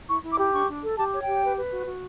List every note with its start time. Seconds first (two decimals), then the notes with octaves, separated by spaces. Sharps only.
0.08 E4 C#6
0.23 E4
0.31 D6
0.38 G4
0.52 D4 C#6
0.68 D4
0.83 A4
0.97 G4 A5
1.12 C#5
1.20 G5
1.27 G4
1.42 B4
1.56 B4
1.71 F#4
1.87 F#4